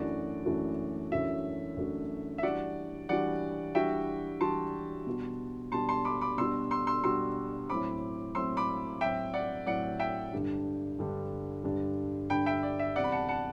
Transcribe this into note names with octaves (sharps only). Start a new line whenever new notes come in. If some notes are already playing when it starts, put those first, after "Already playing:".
Already playing: F#2 E3 A3 D4 F#4 D5
F#2 E3 A3 D4 F#4
F#2 E3 A3 D4 F#4 E5
F#2 E3 A3 D4 F#4
E5
E3 G3 D4 F#4 D5 F#5
E3 G3 D4 F#4 D5 F#5
E3 G3 D4 F#4 E5 G5
E3 G3 D4 F#4 A5 C6
B2 G3 D4 F#4
B2 G3 D4 F#4 A5 C6
A5 C6
B5 D6
B5 D6
B2 G3 D4 F#4 C6 E6
C6 E6
C6 E6
B2 G3 D4 F#4 C6 E6
A2 F#3 C4 B5 D6
A2 F#3 C4 C6 E6
B5 D6
A2 F#3 C4 E5 G5
D5 F#5
A2 F#3 C4 D5 F#5
E5 G5
G2 D3 G3 D4
G2 D3 G3 D4
G2 D3 G3 D4
G2 D3 G3 D4 G5 B5
E5 G5
D5
E5
E2 C3 G3 C4 D5 F#5
B5
F#5 A5
F#5 A5